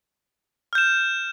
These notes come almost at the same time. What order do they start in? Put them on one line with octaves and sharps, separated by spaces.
F6 G6 E7